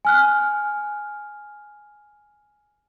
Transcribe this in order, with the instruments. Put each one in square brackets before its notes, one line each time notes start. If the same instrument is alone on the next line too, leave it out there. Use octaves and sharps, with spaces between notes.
[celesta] G#5 F6 F#6